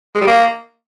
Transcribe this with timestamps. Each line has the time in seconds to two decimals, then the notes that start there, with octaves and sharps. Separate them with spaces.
0.15 G#3
0.21 G3
0.27 A#3